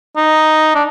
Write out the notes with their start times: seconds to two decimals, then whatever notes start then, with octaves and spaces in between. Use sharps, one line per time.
0.16 D#4
0.75 D4